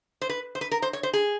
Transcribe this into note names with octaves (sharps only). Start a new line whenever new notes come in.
C5
B4
C5
B4
A#4
C5
C#5
C5
G#4